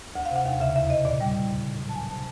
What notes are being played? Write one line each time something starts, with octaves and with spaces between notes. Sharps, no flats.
D2 F#5
F5
C3 F#5
D#2 F5
C#3 E5
E2 E5
C3 D#5
A#2 D5
G3 G5
E2
C#3
A2
F#3
A5
D2 G#5
C3 A5